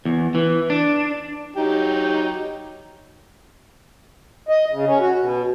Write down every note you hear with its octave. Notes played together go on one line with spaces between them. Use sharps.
E2
E3
D4
F#3 D#4 G4
D#5
C#3
C#4
F#4
B2